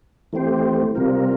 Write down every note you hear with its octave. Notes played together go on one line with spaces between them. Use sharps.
E3 A3 C4 G4 C5
C3 G3 C4 F4 A#4